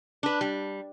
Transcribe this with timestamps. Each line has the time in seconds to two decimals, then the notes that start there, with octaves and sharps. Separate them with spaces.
0.23 D4 B4
0.41 G3